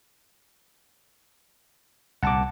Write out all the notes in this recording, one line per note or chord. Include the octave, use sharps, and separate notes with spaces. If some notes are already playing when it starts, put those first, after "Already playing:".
C2 A#2 F#5 A5 D6